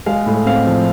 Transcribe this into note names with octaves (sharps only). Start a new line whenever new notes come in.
G#3 F5
A2
C4 F5
F3